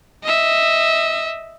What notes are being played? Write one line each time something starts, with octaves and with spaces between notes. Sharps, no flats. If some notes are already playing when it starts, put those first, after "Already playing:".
D#5 E5